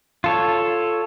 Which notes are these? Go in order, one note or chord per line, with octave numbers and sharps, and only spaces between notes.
F4 A4 C#5